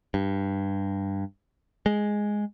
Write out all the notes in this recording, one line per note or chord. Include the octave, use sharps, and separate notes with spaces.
G2
G#3